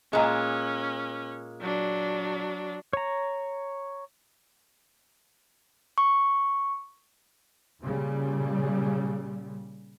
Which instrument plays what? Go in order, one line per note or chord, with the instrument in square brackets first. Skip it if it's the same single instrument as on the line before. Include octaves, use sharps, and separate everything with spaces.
[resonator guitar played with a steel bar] A#2 G#3 [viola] C#4
[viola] F#3 D4
[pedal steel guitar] C#5 A#5
[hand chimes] C#6
[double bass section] A#2 C#3 G3